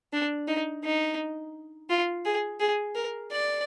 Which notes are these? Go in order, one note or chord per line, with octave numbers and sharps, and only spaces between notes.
D4
D#4
D#4
F4
G#4
G#4
A#4
D5